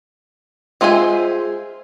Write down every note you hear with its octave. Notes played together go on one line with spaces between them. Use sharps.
G#3 F4 C5 E5 G#5